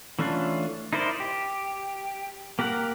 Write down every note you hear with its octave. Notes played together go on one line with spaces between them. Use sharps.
E3 A3 C#4 D4 F4
D#4 E4 A#4 C5 D5
G4
A#3 G4 A#4 F#5